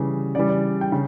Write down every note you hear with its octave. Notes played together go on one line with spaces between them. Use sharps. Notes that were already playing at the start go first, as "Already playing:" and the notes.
Already playing: C#3 E3 G3
C#3 E3 G3 D5
D5
G5
C#3